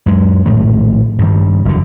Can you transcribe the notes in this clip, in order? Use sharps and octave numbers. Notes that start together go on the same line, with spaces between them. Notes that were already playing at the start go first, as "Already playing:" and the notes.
F#2 G#3
A#1 A2 D#3 A3
G2 D#3 G3
F#1 E2 D3